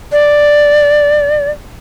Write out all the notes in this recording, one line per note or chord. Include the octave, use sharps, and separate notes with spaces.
D5